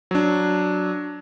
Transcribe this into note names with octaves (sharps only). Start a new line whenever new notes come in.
F#3 D4